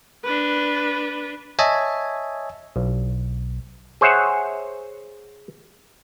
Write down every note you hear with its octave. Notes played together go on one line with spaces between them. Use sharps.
D4 B4
C#5 D#5 E5 G#5 A5
B1
G#4 C5 C#5 E5 F#5